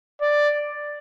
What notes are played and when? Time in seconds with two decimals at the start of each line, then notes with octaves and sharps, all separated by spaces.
0.21 D5